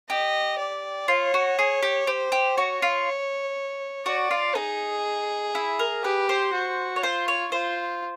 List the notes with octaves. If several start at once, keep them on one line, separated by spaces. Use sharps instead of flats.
G4 D#5
D5
F4 C#5
F#4
G#4
G4
G4 C5
G4
F#4 C#5
F4
F#4 D5
F4
D#4 G#4
E4
A#4
G4 B4
C5
F#4
C#5
F4 C5
C#5
F4 C5